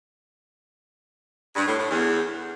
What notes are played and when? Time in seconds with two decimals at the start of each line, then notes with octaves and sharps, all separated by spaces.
1.55 G2
1.66 A2
1.78 A2
1.89 E2